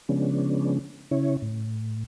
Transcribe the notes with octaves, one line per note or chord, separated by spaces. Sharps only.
C#3 F3 G#3 B3 C#4 D4
C#3 C#4 E4 C#5
A2